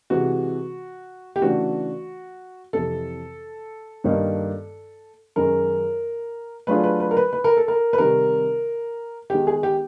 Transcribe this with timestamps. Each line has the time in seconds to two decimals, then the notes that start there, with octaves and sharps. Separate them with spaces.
0.10 C3 E3 G#3 F#4
1.36 G4
1.42 C#3 E3 A3 D4 F#4
2.73 F2 C3 E3 A4
4.04 G2 D#3 G3 A#3 D#4
5.36 F#2 D#3 G#3 C#4 A#4
6.67 F#3 A3 D4 F4 G#4 B4
6.84 B4
7.00 B4
7.11 A#4
7.17 B4
7.33 B4
7.44 A#4
7.57 A4
7.68 A#4
7.93 B4
7.98 C3 D#3 G3 A#4
9.30 D#3 G#3 B3 G4
9.47 G#4
9.63 G4